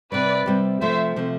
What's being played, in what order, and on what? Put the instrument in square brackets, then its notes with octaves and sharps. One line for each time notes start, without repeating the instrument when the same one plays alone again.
[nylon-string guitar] C3 G3 C4 [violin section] B4 D5
[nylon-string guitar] C3 G3 C4
[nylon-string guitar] C3 F3 A3 [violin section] C5 E5
[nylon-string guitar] C3 F3 A3